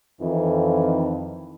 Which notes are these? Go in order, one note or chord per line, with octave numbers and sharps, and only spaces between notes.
F2 D#3 E3